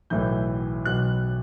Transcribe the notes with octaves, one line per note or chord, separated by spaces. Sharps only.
B1 A2 E3 G6
B1 B2 F#6